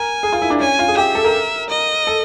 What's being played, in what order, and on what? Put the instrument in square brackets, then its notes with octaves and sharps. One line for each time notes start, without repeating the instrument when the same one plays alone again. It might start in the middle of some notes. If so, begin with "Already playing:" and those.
Already playing: [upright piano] A#4 [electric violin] G#5
[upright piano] G#4
F4
E4
D4
[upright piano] C#4 [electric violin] G#5
[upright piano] F4
G#4
[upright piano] G4 [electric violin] E5
[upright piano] A4
A#4
[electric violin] D#5
[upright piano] A4